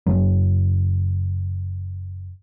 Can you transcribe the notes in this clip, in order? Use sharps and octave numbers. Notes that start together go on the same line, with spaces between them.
F#1 F#3